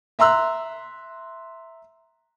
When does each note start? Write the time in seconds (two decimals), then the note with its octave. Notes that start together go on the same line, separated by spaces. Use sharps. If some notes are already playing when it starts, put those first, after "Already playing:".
0.19 E5 A#5 C6 E6 F#6